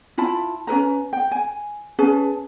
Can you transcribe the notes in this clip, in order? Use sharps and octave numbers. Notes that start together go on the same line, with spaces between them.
E4 F4 A5 B5
C#4 A4 B4 A#5
G5
G#5
C#4 G#4 B4 A5